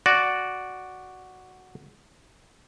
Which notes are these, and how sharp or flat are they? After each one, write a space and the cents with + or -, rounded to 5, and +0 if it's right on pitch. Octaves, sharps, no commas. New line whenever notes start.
F#4 +0 D5 +0